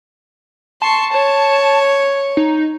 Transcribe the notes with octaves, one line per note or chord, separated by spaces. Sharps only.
A5 C6 C#6
C#5
D#4